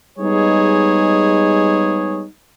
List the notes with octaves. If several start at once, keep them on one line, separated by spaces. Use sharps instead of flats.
G3 G#3 B3 D#4 G#4 C#5